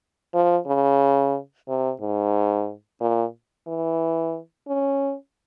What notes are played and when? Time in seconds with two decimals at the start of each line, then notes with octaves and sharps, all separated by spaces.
0.34 F3
0.67 C#3
1.68 C3
2.01 G#2
3.01 A#2
3.67 E3
4.68 C#4